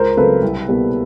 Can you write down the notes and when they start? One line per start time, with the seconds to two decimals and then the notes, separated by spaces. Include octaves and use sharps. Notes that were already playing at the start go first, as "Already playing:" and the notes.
Already playing: C#2 A#4 C5
0.17 C#3 F#3 A3 C4 A4 B4
0.42 C2
0.67 B2 G3 A#3